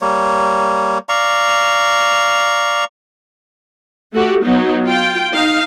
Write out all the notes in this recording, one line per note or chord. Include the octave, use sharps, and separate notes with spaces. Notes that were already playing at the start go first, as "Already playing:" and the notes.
G3 A#3 C#5
D5 F5 A#5 C#6
A3 F#4 G4
F#3 B3 D#4
F4 G5
D#4 F5